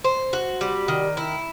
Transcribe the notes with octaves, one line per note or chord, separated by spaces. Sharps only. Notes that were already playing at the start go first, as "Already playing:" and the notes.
C5
F#4
G3
D#3
E4